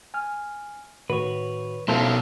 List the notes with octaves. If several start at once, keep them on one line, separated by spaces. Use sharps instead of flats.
G#5 F6
A2 D#3 F#4 B4 C#5
B2 C#4 E4 A4 A#4 C5 F5 G6